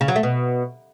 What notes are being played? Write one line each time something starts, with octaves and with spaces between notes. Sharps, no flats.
C#3
F#3
A3
B2